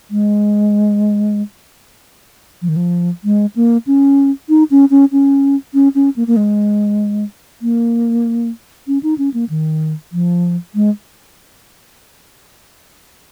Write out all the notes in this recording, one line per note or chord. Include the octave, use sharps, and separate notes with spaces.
G#3
F3
D#3
F3
G#3
A#3
C#4
D#4
C#4
C#4
C#4
C#4
C#4
A#3
A#3
G#3
A#3
C#4
D#4
C#4
A#3
D#3
F3
G#3